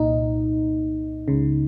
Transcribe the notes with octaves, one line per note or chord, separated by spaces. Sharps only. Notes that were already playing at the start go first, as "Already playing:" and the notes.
Already playing: C2 A#2 D#4
C#2 C#3